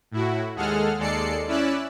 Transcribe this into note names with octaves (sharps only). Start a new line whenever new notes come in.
A2 E4 F#4
D#2 G#3 G#4 A4 F#5 F6
D#2 G#3 A4 D5 C7 C#7
C#4 E4 D5 E6 F#6